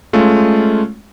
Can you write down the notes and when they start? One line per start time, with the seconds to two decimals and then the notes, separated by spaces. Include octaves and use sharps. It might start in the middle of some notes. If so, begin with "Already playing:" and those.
0.13 G#3 A3 C#4 F4